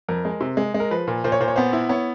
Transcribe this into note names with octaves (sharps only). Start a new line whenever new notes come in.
F2 A#4
G#3
C3
G#3
G#3
A#4
F3 B4
A#2
A#2 C5
C#5
A#2 C5
C#5
B3 C5
E4
B3 C#5